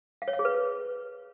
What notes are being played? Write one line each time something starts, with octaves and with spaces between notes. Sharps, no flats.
F5
C#5
F5
G#4
B4